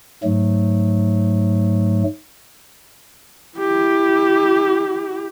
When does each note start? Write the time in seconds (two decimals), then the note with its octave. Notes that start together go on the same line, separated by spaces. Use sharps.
0.24 G#2 F#3 A3
3.58 E4 G4